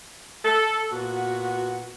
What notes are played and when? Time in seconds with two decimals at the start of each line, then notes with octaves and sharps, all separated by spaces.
0.45 A4
0.92 A#2 B3 F#4